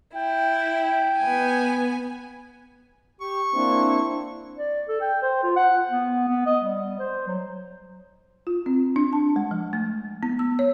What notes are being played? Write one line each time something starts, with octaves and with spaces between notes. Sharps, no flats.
E4 G5
B3 G#5
G4 C#6
A#3 C4 D4 E4
D5
A4
G5
C5
F4
F#5
B3
B3
D#5
G3
C5
F#3
F4
C4
D4
A5
G#3
F3
A3
B3
E6
C#5